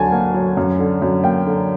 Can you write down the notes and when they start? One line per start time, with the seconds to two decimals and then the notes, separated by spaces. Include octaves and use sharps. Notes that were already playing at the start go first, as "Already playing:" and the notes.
Already playing: D2 D3 F#3 G#5 A5
0.12 A#3
0.34 F#3
0.57 F#2
0.79 D3
1.02 F#2
1.24 A#3 G5
1.46 D3